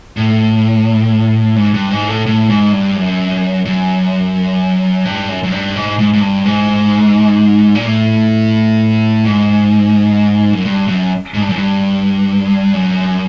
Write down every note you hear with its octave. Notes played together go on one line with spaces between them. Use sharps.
A2
G#2
G2
G#2
A2
A2
G#2
G2
F#2
F#2
G2
F#2
F#2
G2
G#2
G#2
G#2
G2
G#2
A#2
A2
G#2
F#2
G2
F#2
G#2
G2
F#2
G2
F#2